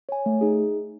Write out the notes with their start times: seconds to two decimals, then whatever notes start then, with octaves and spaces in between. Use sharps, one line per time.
0.09 C#5 G#5
0.26 A3
0.41 D#4 G#4